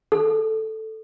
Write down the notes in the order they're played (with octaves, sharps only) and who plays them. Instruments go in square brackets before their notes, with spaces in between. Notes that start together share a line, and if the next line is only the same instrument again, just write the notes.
[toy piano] A4